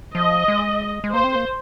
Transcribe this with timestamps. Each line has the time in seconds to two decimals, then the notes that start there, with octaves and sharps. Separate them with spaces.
0.15 F3 D#5
0.48 G#3
1.04 G#3
1.13 A#3 C5
1.24 C4
1.35 A#3